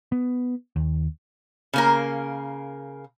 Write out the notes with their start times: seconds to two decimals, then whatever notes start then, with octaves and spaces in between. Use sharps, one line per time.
0.12 B3
0.76 D#2
1.73 C#3 A#3 A#4